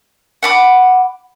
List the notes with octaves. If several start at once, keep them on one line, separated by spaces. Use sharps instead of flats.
F#5 B5 D6